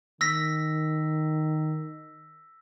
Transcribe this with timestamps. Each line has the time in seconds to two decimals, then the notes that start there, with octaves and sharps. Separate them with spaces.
0.21 D#3 E6 A#6 B6